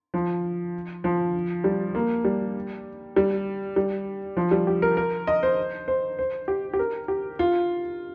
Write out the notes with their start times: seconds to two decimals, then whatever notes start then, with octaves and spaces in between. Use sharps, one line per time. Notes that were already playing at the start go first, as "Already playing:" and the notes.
0.14 F3
1.04 F3
1.64 G3
1.95 A#3
2.25 G3
3.16 G3
3.76 G3
4.37 F3
4.51 G3
4.67 G4
4.82 A#4
4.97 A#4
5.27 D#5
5.43 C5
5.88 C5
6.19 C5
6.48 G4
6.73 G4
6.79 A#4
7.08 G4
7.39 F4